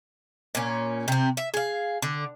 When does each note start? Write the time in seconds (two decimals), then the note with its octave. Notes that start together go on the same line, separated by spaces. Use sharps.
0.55 A#2 C#4
1.08 C3 C4
1.37 E5
1.54 G#4 F5
2.02 D3